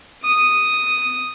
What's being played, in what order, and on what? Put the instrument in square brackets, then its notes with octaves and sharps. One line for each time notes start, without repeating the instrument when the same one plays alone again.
[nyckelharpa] D#6